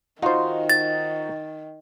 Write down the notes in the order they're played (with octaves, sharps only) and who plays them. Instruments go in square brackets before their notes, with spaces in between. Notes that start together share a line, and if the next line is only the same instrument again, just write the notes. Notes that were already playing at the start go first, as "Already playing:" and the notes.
[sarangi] D#3 [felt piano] D#4 F#4 [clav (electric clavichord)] F4 C5
[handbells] A6